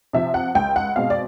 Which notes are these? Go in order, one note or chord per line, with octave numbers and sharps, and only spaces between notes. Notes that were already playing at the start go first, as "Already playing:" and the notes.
C3 F3 E5
F#5
C#2 G5
F#5
B2 G#3 C4 F5
D5